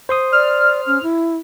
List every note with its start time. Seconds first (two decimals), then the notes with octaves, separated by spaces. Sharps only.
0.09 C5 C6 D#6
0.32 D5 F6
0.87 C#4
1.03 E4